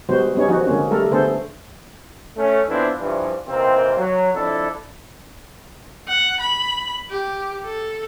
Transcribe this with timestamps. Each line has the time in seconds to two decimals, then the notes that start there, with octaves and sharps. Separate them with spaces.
0.09 D#3 G3 G#3 B3 F#4 C5
0.35 G3 B3 C#4 D#4 C#5
0.48 D#3 F3 D#4 F#4
0.67 D3 G#3 A#3 C4 C#4
0.91 G3 A3 A4 A#4
1.11 D3 A3 B3 G#4 A4 C5
2.37 A3 C#4
2.68 E3 B3 C4 D4 E4 F4
2.99 G2 E3 F3
3.48 C3 D#3 E3 A#3 C4
3.97 F#3
4.34 F2 D4 E4 A4
6.08 F#5
6.40 B5
7.11 G4
7.65 A4